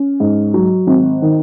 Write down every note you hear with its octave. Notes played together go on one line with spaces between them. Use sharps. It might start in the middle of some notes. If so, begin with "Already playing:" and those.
Already playing: C#4
G#2
F#3
G#1
D#3